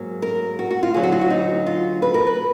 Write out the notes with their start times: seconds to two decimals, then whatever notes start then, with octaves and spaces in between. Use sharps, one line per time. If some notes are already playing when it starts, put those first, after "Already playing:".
Already playing: G#2 F#3 A#3
0.22 A#4
0.59 F#4
0.71 F#4
0.83 F4
0.94 D2 D3 F#3 G#4
1.03 F#4
1.12 F4
1.21 F#4
1.30 D#4
1.66 F4
2.02 B4
2.14 A#4
2.27 B4